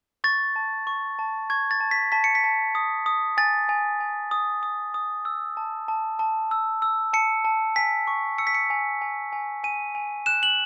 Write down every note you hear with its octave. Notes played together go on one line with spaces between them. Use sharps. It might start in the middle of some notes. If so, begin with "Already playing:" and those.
C#6 A6
A5
C#6
A5
C#6 G#6
A6
A5
B6
A5 B6
C#7
B6
A5
D#6
D#6
G#5 A6
G#5
G#5
D#6
D#6
D#6
E6
A5
A5
A5
E6
E6
A5 C#7
A5
G#5 B6
C#6
E6 C#7
B6
C#7
G#5
G#5
G#5
G#5 D#7
G#5
F#6 E7
F#7